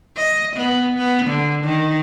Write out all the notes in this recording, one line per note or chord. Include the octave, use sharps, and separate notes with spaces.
D#5
B3
B3
D3
D#3